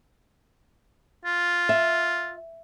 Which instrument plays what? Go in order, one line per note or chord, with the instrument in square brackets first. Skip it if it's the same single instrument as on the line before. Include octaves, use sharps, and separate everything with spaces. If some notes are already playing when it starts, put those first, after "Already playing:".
[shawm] F4
[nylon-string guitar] E5